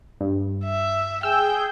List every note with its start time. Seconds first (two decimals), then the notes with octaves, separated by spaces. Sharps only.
0.21 G2
0.65 E5
1.23 G#4 G5 E6 G6